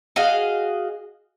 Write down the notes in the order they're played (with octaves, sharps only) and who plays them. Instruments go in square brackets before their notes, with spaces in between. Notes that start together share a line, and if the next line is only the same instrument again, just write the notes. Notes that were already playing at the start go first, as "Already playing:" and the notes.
[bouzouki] F#4 G#4 D#5 F5